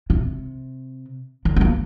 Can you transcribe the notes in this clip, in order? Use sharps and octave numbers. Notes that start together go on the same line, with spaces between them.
C3
D3
A3
A#3